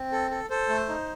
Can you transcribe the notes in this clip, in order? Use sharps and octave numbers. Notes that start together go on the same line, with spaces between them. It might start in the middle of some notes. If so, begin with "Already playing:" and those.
Already playing: C4
A4
A4
A4 C5
A3
D#4